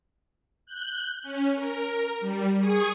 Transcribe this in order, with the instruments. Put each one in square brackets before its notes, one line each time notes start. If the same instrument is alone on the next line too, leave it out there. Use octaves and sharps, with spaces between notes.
[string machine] F#6 G6
C#4
A#4
G3
G#4 C#6 D#6 G#6